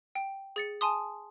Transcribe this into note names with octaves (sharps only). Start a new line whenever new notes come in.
G5
G#4 A6 C#7
G#5 A5 C6 D#6